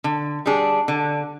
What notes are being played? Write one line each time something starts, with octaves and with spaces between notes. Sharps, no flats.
D3
G3 D4 G#4
D3